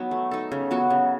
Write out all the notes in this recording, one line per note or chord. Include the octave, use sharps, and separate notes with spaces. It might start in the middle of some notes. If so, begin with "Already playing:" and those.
Already playing: F#3 B3 D#4
A3
D#4 A4
C#3
F#3 B3 F#4
C#3